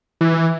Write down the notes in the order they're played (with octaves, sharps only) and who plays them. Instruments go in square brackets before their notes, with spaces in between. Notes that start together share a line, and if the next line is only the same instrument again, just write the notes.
[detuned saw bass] E3